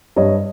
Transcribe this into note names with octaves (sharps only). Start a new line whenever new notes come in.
G2 C#5 D#5